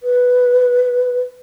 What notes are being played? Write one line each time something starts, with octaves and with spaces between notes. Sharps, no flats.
B4